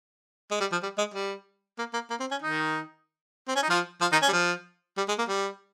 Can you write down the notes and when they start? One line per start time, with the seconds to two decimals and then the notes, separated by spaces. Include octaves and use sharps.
0.51 G#3
0.60 G3
0.72 F3
0.83 G3
0.98 G#3
1.14 G3
1.78 A#3
1.93 A#3
2.10 A#3
2.20 C4
2.31 C#4
2.42 D#3 D#4
3.48 C4
3.56 C#4
3.63 D#4
3.70 F3 F4
4.01 F3 F4
4.12 D#3 D#4
4.22 C#4
4.29 G3
4.33 F3
4.97 G3
5.08 G#3
5.18 A#3
5.28 G3